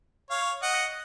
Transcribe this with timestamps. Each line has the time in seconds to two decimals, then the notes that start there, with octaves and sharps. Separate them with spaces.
0.30 C#5 F5
0.63 D#5 F#5